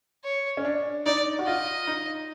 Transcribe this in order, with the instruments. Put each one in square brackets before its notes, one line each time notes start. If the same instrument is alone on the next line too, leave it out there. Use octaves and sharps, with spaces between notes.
[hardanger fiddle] C#5
[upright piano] C#4
D4
[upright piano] D#4 [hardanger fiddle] D5
[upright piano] F#4
[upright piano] F4 [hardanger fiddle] D#5
[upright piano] D#4